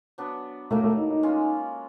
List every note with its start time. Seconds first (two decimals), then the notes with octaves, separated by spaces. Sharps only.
0.18 F#3 B3 D4
0.71 A2 F#3 A3 A#3
0.84 A3
0.97 D#4
1.10 D#4
1.23 G#3 C#4 F4